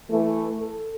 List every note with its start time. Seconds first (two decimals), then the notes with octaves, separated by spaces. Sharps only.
0.10 E3 A3
0.59 A4